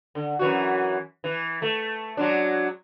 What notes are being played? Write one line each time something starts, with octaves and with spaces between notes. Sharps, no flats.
D3
F#2 E3 F#4
E3
A3
F#3 G#3 D4